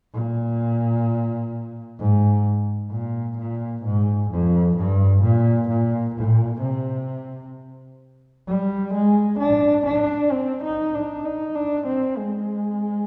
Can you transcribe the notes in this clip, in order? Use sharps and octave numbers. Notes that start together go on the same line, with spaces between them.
A#2
G#2
A#2
A#2
G#2
F2
G2
A#2
A#2
A#2
C3
G3
G#3
D4
D4
C4
D#4
D4
D#4
D4
C4
G#3